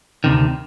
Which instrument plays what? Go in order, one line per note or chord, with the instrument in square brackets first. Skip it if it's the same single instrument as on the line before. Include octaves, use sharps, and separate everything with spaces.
[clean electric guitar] D2 C3 D#3